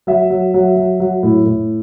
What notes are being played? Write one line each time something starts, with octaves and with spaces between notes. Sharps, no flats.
F#3 E5
F#3
F#3
F#3
F#3
A2
A2